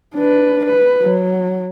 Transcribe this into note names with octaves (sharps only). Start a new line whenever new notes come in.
D4 B4
B4
F#3